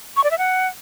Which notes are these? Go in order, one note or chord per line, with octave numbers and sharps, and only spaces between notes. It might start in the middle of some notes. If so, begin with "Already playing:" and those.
C#6
D5
E5
F#5